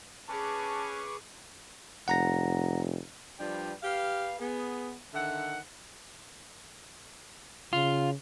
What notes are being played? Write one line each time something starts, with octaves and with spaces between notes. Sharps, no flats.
C#4 G#4 B4 A5 C#6 D6
F1 F#5 A#5 A#6
F3 G3 D4 B4 G5
G4 B4 F5
B3 G#4
D3 D#3 E5 F#5
C#3 F4